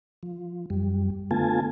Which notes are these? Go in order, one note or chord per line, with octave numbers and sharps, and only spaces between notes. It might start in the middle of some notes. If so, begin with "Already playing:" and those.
F3
F#2 G3
D3 A3 B3 F4 G#5 A5